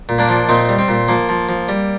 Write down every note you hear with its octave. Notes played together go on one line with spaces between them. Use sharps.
A#2
A#3 D4
F3
A#2 C4 D#4
G3
C4
A#2
F3 A#3
F3
F3
G3